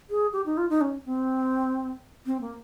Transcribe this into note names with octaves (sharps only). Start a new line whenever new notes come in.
G#4
G4
D#4
F4
D#4
C#4
C4
C4
A#3